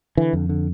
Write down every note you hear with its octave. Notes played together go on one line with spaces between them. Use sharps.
D3 E3
F2
D3